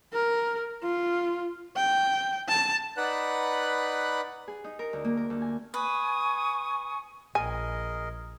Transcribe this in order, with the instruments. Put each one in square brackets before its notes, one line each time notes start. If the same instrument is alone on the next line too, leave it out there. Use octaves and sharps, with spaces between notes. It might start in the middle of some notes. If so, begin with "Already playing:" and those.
[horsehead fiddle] A#4
F4
G5
A5
[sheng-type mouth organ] D#4 B4 D5 F#5 B5 F#6
[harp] G#4
D#4
A#4
D2
A#3
A#4
D2
G#5
[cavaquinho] B4 [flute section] G#5 C#6 D#6
[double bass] A#1 [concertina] G#4 A#4 D#5 [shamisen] G#5